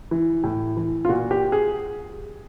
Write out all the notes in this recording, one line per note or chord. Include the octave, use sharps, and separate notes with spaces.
E3
A2
E3
F4
A#2 F#4
G4
G#4